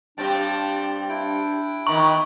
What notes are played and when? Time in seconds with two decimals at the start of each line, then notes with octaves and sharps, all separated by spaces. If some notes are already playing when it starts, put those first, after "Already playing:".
0.18 G2 C4 D4 G4 G5 A5
1.09 D4 E4 G5
1.87 D#3 F3 B3 A#5 C#6